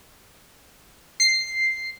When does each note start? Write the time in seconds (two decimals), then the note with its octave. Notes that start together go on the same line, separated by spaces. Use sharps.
1.20 C7